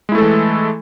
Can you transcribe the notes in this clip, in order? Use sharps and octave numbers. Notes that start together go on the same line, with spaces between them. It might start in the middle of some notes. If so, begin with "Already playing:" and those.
E3 G#3 A3 E4 A4